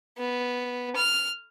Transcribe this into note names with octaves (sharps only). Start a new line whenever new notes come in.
B3
F6